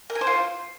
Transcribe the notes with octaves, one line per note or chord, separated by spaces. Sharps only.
A#4
G#5
C5
F4